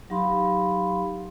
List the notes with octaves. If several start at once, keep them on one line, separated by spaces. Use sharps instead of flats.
F#3 D#4 G4 F5 B5 C6